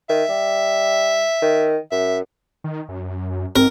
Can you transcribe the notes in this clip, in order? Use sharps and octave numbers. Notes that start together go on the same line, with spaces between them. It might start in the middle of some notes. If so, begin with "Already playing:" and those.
D#3 E5
G3
D#3
F#2 E5
D#3
F#2
G#2 C4 A#4